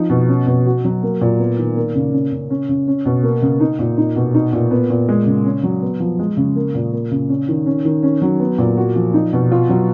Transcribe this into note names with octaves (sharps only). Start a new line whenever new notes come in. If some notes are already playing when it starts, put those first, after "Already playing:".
Already playing: F3 D#4
B2
C#4
B2
F#4
F#3
A#3
A#2
B3
D#3
A#3
C#3
C#4
C#3
C#4
C#3
C#4
B2
A#3
C#3
D#4
A#2
D#4
B2
D#4
A#2
B3
A#2
G#3
C#3
C#4
F#3
B3
F3
G#3
C#3
A#3
A#2
A#3
C#3
C#4
D#3
C#4
D#3
C#4
F#3
B3
A#2
F#4
F3
D#4
B2
F4
F#3